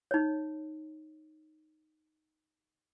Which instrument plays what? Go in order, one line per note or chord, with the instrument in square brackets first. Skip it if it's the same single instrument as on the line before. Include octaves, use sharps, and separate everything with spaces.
[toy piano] D#4 C#5